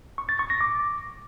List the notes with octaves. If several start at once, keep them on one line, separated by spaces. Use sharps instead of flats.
C#6
A6
C#6
A#6
D6